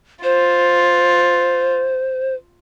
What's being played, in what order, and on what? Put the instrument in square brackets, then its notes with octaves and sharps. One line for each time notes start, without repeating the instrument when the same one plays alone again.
[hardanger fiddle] F4 [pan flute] C5